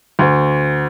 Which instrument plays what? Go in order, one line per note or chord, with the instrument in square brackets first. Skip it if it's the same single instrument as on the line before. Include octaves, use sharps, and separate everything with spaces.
[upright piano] D2